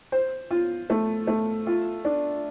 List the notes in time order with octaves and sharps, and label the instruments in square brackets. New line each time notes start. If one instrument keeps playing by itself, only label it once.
[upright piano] C5
F4
A3
A3
F4
D4